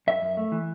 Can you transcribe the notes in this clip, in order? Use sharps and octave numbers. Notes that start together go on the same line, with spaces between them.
F#2 E5
F#2
A3
E3